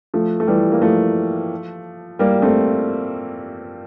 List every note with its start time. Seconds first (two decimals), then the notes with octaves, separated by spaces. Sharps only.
0.14 F3 A3
0.40 A3
0.47 E3 G3
0.72 A#3
0.82 F3 A3
2.19 G3 A#3
2.42 A3 C4